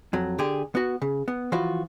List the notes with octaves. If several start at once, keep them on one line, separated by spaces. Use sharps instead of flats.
F2 F#3
D3 G4 G#4
B3 F#4
C#3
B3
E3 F3 F4 F#4